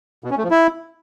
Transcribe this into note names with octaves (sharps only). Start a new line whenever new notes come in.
B2
C#4
A3
F3
E4